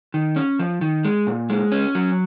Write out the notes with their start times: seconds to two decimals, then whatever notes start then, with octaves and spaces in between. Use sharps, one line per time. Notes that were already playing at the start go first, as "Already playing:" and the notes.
0.14 D#3
0.36 C#4
0.59 F3
0.81 D#3
1.04 G#3
1.27 A#2
1.50 G#3
1.72 C#4
1.95 F#3